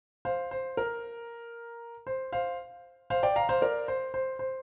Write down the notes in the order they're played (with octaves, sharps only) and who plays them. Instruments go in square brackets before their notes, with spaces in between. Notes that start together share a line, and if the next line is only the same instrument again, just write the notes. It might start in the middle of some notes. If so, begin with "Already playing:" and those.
[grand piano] C5 F5
C5
A#4
C5
C5 F5
C5 F5
D5 G5
F5 A#5
C5 F5
A#4 D5
C5
C5
C5